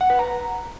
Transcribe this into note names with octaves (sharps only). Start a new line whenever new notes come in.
F#5
B4
A#5